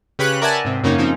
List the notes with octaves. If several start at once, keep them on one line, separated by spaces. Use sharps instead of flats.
C#3 G4 B4 C#5 B5 F#6
A#4 D5 E5 F#5 G#5 A5
G#2 C3
F#2 C#3 A#3 C#4 D#4
F3 C4 C#4 D#4